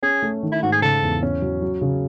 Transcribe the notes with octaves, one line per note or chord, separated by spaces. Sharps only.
C#4 G#4
A3
D#3
E4
G#2 F#4
G#4
C#3 A4
E2
C#4
F#3
F#3
C#3